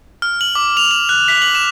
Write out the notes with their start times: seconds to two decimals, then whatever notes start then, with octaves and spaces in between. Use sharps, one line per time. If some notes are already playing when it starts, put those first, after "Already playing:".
0.22 F6
0.41 F#7
0.55 D6
0.77 F7
0.91 F#7
1.09 F#6
1.28 B6
1.42 F#7
1.55 E7